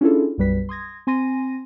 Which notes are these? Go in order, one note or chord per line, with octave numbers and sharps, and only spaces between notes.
C#4 D4 E4 F4 G#4 A4
B1 F#2 G3 B4 B6
C6 D#6 G#6 A#6
C4 G#5 C6 A#6 D#7